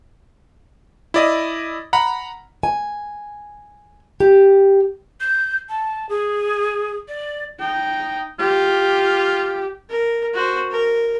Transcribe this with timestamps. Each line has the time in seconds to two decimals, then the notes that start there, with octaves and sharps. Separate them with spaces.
1.14 E4 D5 D#5
1.93 F#5 A#5 B5
2.63 G#5
4.20 G4
5.21 G6
5.69 A5
6.09 G#4
7.08 D5
7.60 D#4 G5
8.40 F4 G4
9.90 A#4
10.34 F#4 C5
10.71 A#4